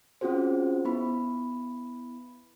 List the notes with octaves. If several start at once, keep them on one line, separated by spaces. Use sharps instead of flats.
C4 C#4 F4 F#4 G#4 C5
B3 E4 B5